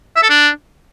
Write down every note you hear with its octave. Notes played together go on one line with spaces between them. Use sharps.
E5
A4
D4